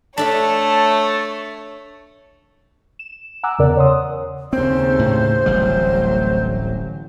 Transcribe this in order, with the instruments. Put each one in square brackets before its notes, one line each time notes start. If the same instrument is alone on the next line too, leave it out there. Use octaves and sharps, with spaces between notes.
[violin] A3 C#5 [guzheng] D4 A4 E5 [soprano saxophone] A5
[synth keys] E7
F#5 G#5 A#5 D6 E6 F#6
E2 C#3 A#4 D5
C#5 F#5 C6 D#6
[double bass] D#2 C#3 [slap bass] C4 [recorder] C5
[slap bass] A2
[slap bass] D1 A1 G3 [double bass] F#3